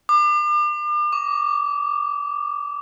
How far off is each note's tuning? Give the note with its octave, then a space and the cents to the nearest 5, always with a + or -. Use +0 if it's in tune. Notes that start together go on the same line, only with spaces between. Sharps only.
D6 +40
D6 -25